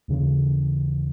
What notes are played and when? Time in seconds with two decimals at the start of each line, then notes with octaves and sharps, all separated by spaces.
0.08 D#2 C#3 E3